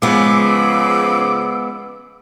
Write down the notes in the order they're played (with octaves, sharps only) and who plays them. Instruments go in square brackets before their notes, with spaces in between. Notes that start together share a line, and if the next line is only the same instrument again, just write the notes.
[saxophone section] C#3 F3 [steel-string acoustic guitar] G#3 B3 [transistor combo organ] D6 [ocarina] E6